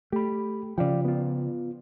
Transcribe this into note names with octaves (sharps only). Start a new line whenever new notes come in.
A3 G4 B5
C#3 F3 D5 F5 G5
B3 F4